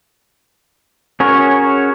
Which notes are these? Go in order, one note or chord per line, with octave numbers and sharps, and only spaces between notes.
C#4 F#4 G#4 A#4 C#5